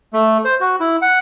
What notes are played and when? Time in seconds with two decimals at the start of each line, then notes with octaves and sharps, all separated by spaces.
0.13 A3
0.45 C5
0.61 F#4
0.80 E4
1.02 F#5